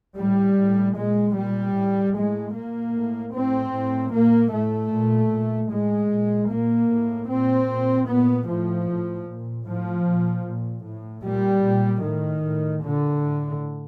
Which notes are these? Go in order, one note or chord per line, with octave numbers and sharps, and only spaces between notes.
A2 G3
A2
A#2 G#3
A#2 G3
A2
A2 G#3
A#2 A#3
A2
A2 C4
A2
A#2 A#3
A2 A3
A#2
A#2
A2 G#3
A#2
A#2 A#3
A2
A#2 C4
A#2
A#2 B3
A2 F3
A2
A#2
A2 F3
A#2
A#2
A2
A#2 G3
A#2
A2 D#3
A2
A#2 D3
A2